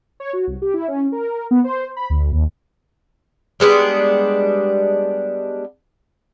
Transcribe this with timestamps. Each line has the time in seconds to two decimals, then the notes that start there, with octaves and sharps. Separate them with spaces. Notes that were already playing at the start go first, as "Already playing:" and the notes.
0.20 C#5
0.33 F#4
0.47 C2
0.62 G4
0.74 E4
0.88 C#4
1.12 A#4
1.51 B3
1.64 C5
1.96 B5
2.10 D2
2.32 D#2
3.60 G3 G#3 B3 D4